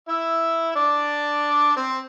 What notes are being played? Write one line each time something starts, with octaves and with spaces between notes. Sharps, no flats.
E4 E5
D4 D5
C4 C5